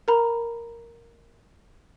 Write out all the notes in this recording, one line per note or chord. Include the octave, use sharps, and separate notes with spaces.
A#4 A#5 B5